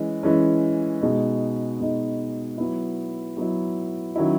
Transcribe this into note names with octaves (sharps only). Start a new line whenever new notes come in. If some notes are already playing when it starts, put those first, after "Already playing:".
Already playing: E3 G#3 C#4
E3 G#3 C#4
B2 G#3 D#4
B2 G#3 D#4
F#3 B3 E4
F#3 B3 E4
D#3 F#3 C#4 E4